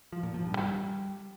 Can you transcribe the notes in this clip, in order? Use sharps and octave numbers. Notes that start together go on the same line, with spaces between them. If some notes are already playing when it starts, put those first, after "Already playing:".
F3
A#2
F3
G2
G3